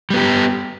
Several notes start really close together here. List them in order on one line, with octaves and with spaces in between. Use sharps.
G3 B3 G4